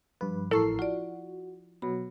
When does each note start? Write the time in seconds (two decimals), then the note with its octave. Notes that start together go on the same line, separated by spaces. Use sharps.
0.21 G2 F3 B4
0.51 A1 E4 A4 A#4 C#6 C7
0.79 F4 F#4 D5
1.82 B2 F#3 B5